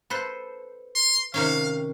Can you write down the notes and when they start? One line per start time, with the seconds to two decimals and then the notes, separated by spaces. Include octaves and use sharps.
0.10 A4 B4 C5
0.95 C6
1.34 C3 D#3 C#4 F5